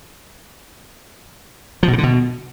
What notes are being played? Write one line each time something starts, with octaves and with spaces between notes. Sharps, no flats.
F3
B2
C#3
D3
B2